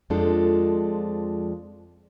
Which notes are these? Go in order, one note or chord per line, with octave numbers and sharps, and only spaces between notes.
F2 F3 G#3 D4 F4 A4